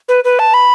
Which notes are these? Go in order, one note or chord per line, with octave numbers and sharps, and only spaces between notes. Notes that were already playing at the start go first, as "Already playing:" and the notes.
B4
B4
A5
B5